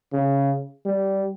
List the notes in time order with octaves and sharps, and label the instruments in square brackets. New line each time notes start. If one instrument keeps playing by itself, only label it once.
[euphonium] C#3
G3